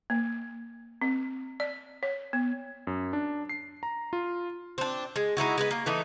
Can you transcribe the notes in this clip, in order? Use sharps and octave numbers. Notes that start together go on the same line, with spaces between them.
A#3
C4
D5
C#5
B3
F#2
D4
C7
A#5
F4
C4 D4
G#3
G#3 D#4 E4 F#4
G#3 B3 B4
A#3
E3 A3 D#4